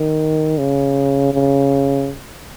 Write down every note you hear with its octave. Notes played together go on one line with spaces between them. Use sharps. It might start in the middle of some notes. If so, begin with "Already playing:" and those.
Already playing: D#3
C#3
C#3